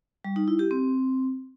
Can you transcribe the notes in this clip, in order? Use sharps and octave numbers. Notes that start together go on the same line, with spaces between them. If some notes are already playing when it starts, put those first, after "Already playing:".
G3
D#4
E4
G4
C4